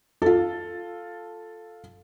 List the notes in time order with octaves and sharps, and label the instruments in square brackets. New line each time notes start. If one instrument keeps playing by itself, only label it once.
[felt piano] F4 A4